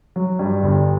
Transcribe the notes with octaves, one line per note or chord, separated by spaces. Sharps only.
F#3
G2
G1